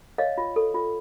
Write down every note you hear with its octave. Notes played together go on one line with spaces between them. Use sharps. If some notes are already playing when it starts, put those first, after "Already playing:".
C#5 D#5 F5
F4
A4
F4